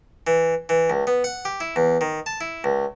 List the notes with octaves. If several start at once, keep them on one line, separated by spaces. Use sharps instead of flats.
E3
E3
C#2
B3
F#5
G4
E4
E2
D#3
A5
E4
C#2